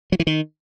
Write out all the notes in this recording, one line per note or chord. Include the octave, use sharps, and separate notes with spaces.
F#3
E3
D#3